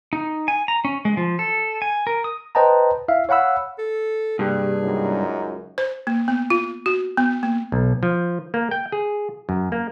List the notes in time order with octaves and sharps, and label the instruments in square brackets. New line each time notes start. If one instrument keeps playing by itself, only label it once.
[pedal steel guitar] D#4
G#5
A#5
C#4
G#3
F3
A4
G#5
A#4
D#6
[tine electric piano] B4 C5 D#5 G5 A5 A#5
E4 E5 F5
C#5 F5 F#5 B5 E6
[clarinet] A4
[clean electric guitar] G2 [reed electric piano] C3 A#3 G4 [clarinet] G#4
[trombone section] C#2 F#2 D#4
[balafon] C5
A#3
B3
F4
F#4
B3
A#3
[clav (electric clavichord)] B1
F3
A#3
G5
G#4
F#2
A#3